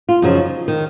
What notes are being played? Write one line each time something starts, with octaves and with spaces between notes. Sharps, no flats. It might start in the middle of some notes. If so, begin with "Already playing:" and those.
F4
F#2 C#3 F3 D#4
D#3